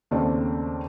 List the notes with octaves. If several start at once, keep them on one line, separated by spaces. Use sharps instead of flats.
D#2 C#3 A3 C4 D5 A5